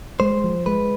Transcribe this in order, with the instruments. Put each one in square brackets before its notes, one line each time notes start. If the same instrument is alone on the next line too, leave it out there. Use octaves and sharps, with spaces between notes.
[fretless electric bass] G#3 [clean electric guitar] C5
[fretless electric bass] F3
[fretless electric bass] G#3 [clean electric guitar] B4